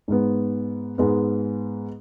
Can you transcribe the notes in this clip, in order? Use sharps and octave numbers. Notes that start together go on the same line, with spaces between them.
G#2 G#3 B3
G#2 G#3 B3